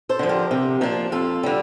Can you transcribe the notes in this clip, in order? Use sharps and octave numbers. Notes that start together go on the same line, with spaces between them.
A4 C5
D3 F3
G4 A#4
C3
F3 A#3 D4
F2 F4 A4
D3 G3